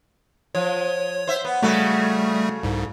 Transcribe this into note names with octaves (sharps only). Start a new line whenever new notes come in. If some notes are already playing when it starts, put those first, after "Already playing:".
F3 C#5
C5 E5
B3
C#3 G3 A3 F#4 A4
C2 G#2